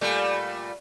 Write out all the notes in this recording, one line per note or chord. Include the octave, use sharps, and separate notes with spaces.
A#2 G3 A3